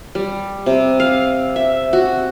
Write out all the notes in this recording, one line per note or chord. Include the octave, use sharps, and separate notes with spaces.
G3
C3
F5
E5
F#4